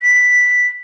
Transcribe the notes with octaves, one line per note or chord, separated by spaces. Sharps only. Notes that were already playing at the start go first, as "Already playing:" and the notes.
B6